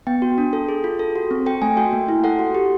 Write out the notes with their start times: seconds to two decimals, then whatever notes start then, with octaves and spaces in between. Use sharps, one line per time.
0.07 B3 G5
0.22 F#4
0.38 D4
0.53 A4
0.69 G#4
0.84 F4
0.99 A4
1.16 F#4
1.31 C4
1.46 A4 G5
1.62 A3 G#5
1.77 F#4 G5
1.93 A#3
2.08 E4
2.24 A4 F#5
2.39 F#4
2.55 G4